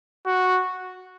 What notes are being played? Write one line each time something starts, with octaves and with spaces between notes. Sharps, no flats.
F#4